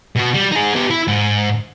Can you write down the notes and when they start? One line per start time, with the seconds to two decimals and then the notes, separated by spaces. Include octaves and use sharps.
0.16 B2 F#4
0.34 G3
0.51 D#4 G#4
0.74 B3 G4
0.90 E4
1.08 G#2